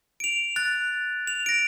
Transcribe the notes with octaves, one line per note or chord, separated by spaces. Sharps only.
D7 F7
F#6 A6
F7
A#6 D7